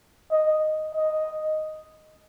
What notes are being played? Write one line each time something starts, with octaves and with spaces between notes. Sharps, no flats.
D#5
D#5